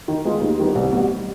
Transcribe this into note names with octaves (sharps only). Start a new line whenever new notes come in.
D#3
G#3 B3 F4 G#4
D#2
D#3 G3 B3
C2
B2 G3